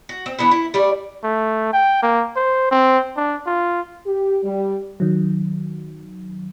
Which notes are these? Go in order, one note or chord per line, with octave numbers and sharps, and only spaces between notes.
F#4
C4
E3 B3 D4 E4
E4
G3 A3 D5
A3
G5
A#3
C5
C4
D4
F4
G4
G3
D#3 F#3